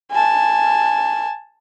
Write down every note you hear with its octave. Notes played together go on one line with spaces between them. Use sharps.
G#5 A5